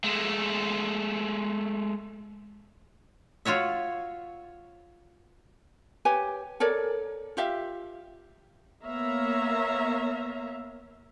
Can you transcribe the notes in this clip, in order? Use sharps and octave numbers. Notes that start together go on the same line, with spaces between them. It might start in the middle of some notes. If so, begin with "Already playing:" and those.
G#3 A3
F4 F#4 C#5 E5
G4 B4 C#5 G#5
A4 A#4 C#5 D5
F4 G4 E5 F5
A#3 B3 C#5 E5 F5 A#5